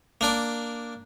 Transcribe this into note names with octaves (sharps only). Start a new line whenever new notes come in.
A#3 D4 D6